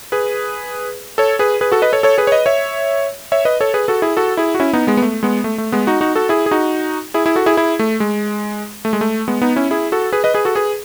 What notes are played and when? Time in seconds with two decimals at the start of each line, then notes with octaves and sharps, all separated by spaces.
0.12 G#4 B4
1.18 A4 C#5
1.39 G#4 B4
1.61 G#4 B4
1.72 F#4 A4
1.82 B4 D#5
1.92 A4 C#5
2.03 A4 C#5
2.18 G#4 B4
2.27 C#5
2.32 B4 D#5
2.46 C#5 E5
3.32 C#5 E5
3.45 B4 D#5
3.61 A4 C#5
3.74 G#4 B4
3.88 F#4 A4
4.02 E4 G#4
4.17 F#4 A4
4.37 E4 G#4
4.55 F#4
4.60 C#4 E4
4.73 B3 D#4
4.87 G#3 B3
4.97 B3
5.02 A3
5.23 G#3 B3
5.44 A3
5.58 A3
5.72 G#3 B3
5.87 D#4 F#4
6.01 D#4 F#4
6.16 F#4 A4
6.29 E4 G#4
6.46 G#4
6.51 D#4 F#4
7.14 E4 G#4
7.26 E4 G#4
7.36 F#4 A4
7.46 E4 G#4
7.57 E4 G#4
7.79 A3
8.00 G#3
8.85 A3
8.93 G#3
9.01 A3
9.28 G#3 B3
9.42 B3 D#4
9.56 C#4 E4
9.71 E4 G#4
9.92 F#4 A4
10.13 G#4 B4
10.24 B4 D#5
10.34 G#4 B4
10.45 F#4 A4
10.55 G#4 B4